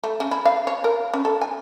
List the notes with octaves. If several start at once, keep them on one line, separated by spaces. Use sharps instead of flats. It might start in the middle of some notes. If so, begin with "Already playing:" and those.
A3
C#3
E4
F5
C#5
A#4
C#4
A4
G#5